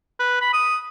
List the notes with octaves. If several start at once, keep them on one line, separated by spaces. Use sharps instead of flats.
B4
B5
D#6